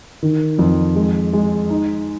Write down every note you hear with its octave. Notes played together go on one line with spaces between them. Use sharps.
D#3
F2
G#3
G#3
D#4